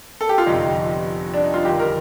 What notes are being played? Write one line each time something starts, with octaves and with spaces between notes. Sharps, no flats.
A4
G4
F4
G1 F2 C3 D#4
D4
D#4
F4
G1 F2 D#3 G4
A#4